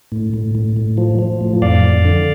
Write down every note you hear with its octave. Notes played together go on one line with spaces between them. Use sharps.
A2
A2
A2
A2
F3
F3
A2
F2 D5 F5
F2
D3